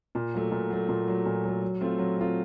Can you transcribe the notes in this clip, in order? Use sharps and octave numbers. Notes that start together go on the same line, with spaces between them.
A#2
F#3 A3
A#2
F#3 A3
A#2
F#3 A3
A#2
F#3 A3
F#3
A3 C4 F4
F#3
A3 C4 F4